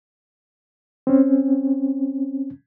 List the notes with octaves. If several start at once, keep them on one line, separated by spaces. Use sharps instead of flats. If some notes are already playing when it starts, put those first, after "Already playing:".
C4 C#4